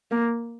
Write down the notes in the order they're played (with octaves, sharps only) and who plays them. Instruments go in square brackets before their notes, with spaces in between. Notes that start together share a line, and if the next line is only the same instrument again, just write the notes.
[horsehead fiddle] A#3